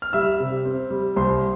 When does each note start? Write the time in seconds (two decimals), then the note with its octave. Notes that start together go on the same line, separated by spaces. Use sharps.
0.02 F6
0.13 G3 E5 E6
0.40 C3
0.65 C4
0.91 G3
1.16 C2 C5 C6